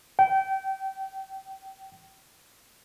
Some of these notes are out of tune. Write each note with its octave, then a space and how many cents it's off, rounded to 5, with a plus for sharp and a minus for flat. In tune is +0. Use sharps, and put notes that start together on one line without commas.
G5 -25